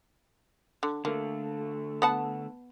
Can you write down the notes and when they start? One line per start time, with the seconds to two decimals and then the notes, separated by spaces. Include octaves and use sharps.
0.83 D3
1.05 D3 A3 A#3
2.02 B3 F#5 A5